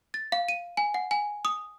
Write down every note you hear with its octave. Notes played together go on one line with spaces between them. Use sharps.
A6
F5
D#7
G#5
F#5
G#5
D#6